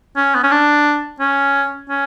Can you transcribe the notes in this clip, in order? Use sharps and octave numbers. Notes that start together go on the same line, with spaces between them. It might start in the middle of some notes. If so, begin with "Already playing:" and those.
C#4
B3
C#4
D4
C#4
C#4